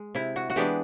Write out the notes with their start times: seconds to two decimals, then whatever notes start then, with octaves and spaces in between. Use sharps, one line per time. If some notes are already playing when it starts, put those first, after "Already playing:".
Already playing: G#3
0.15 C3 E4
0.36 F#4
0.50 F#4
0.56 E3 G#3 B3 D4 G4